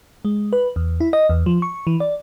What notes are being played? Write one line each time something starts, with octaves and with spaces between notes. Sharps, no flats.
G#3
B4
E2
E4
D#5
E2
F3
C#6
E3
D5